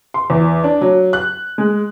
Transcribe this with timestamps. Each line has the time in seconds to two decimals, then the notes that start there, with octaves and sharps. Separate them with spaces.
0.14 C6
0.30 E2
0.64 D4
0.81 F#3
1.13 F#6
1.58 G#3